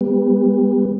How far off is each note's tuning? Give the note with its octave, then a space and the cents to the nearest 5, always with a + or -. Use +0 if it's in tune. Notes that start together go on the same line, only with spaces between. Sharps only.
G3 +30 B3 +0